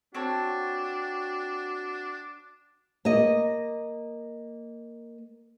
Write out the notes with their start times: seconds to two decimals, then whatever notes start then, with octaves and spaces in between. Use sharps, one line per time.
0.15 C4 D4 F#4 C#5 A5
3.05 A#3 D#5